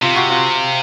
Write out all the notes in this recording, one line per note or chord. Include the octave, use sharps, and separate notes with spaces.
C3 F4
F#4
F4